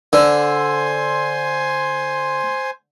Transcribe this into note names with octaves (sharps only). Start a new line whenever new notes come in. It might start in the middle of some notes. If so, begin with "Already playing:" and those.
D3 C5 G#5 C6